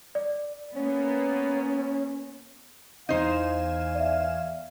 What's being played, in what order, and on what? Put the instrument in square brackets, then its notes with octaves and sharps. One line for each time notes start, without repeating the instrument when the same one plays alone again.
[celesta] D5
[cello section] A#3 B3 [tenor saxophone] C#4
[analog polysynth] E2 G#5 E7 [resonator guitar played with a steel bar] D#4 C5 [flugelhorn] F5
[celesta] D5 E5